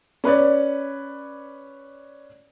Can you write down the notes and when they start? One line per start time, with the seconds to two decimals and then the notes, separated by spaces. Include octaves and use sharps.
0.24 C#4 B4 C#5 D5